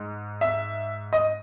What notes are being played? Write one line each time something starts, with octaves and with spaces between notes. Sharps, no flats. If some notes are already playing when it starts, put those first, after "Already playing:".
Already playing: G#2
E5
D#5